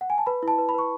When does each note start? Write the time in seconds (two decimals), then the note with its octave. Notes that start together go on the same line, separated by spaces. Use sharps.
0.01 F#5
0.10 G#5
0.18 A5
0.26 B4 B5
0.43 E4 A5
0.58 B4
0.69 B5
0.74 B4 C#6